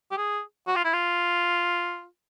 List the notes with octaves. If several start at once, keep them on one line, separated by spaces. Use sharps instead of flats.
G4
G#4
F#4
F4
E4
F4